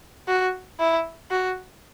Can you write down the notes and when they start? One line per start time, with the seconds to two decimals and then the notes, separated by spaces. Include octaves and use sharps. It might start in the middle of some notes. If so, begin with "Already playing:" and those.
0.28 F#4
0.80 E4
1.31 F#4